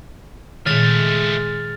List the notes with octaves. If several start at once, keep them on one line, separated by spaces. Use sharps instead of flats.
C#2 A#2 D#3 G#3 A3 F6 A6 F7